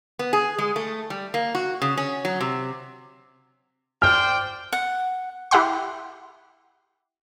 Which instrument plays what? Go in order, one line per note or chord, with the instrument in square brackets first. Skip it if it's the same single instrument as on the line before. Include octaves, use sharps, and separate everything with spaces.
[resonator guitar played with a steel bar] B3
G#4
G#3
A3
G3
A#3
F#4
C#3
C#4
F#3
C3
[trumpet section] C5 D5 G5 [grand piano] F6
[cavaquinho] F#5
[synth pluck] E4 G4 E5 F#5 C6